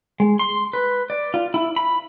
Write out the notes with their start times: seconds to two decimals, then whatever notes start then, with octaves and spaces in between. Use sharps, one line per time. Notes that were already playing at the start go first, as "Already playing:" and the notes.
0.20 G#3
0.39 C6
0.73 B4
1.10 D5
1.34 F4
1.54 E4
1.76 B5